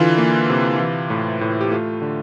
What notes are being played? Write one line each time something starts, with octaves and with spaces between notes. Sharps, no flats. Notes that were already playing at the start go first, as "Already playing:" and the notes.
Already playing: D3 E3 F4
A#3
C3
E3
A2
A2
G4
A3 F4
D3